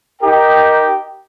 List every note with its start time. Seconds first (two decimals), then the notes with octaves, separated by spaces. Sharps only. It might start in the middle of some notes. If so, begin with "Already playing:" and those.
0.22 D#4 G4 A#4 G5